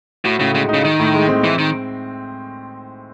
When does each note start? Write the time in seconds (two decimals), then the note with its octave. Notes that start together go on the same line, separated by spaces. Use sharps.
0.24 A2 F#4
0.40 A2 C#3
0.54 C#3 G#3
0.69 D#4
0.74 C#3
0.84 D#3 D#4
1.00 A2
1.13 G#3
1.28 C4
1.43 E3 C4
1.58 D#3